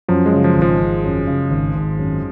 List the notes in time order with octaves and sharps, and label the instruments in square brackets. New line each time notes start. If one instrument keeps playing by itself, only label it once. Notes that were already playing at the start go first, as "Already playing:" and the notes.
[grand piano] F#2 [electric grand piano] F3
[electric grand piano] G#3
[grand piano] C#3
[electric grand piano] F3
[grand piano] G#1
[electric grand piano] F3
[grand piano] G#1
F#2
C#3
G#1
G#1
F#2